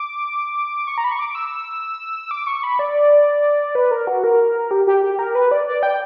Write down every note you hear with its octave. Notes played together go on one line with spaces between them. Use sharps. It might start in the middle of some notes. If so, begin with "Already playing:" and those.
Already playing: D6
C#6
A#5
B5
C#6
D6
E6
D6
C#6
B5
D5
B4
A#4
F#4
A#4
G4
G4
G4
A#4
B4
D5
D5
G5